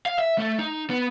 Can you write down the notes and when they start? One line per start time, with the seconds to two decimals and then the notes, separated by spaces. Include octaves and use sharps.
0.06 F5
0.19 E5
0.38 A3
0.59 D#4
0.90 B3